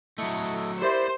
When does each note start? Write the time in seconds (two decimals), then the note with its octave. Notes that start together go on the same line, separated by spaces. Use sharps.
0.18 F#3 A3 E4 A4 D#5
0.82 E4 G4 A#4 C5 D5 E5 B5